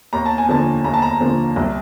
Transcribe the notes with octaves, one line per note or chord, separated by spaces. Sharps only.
D#2 A#5
A5
G#5
D3 F3 A#3 A5
D#2 A#5
A5
A#5
D3 F3 A#3
C2